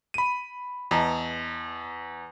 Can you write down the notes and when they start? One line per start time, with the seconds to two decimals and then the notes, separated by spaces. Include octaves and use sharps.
0.14 B5 D#7
0.91 E2 D#5 A5 A#5